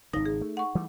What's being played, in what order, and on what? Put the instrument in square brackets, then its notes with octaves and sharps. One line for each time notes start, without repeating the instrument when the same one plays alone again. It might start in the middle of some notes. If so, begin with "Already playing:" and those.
[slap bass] G#1 C#3 [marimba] D#4 A#6
[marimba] G#4
[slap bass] A3
[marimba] F#5 C#6
[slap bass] E3 G3 A3